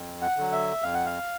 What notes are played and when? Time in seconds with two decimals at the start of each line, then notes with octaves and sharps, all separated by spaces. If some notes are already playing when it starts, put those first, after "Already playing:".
Already playing: F2
0.22 F#5
0.37 D3 F#3
0.52 E5
0.82 F2 F5
0.94 F#5
1.05 F5